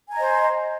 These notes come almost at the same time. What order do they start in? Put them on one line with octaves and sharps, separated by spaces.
G#5 A#5 D#5 C5